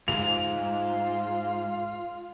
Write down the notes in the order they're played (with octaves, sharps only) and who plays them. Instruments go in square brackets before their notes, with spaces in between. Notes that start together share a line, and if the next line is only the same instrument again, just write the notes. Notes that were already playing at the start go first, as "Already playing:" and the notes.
[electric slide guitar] G#2 [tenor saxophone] F4 [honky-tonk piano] F7